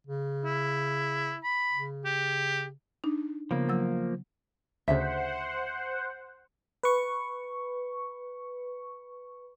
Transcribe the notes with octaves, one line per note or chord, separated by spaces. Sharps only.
C#3
E4
B5
C#3
G4
D4 D#4
C#3 F3 A#3 B3
F#3 E6
D2 C#3 C5 E5 F#5
B4 C#6